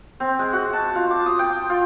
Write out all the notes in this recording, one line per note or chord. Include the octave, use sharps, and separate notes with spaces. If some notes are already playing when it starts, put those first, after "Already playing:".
C4
G#3
F#4
A5
F4
D6
D#6
G5
F4